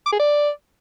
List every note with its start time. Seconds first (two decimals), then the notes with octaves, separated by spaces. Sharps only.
0.06 D6
0.13 G#4
0.19 D5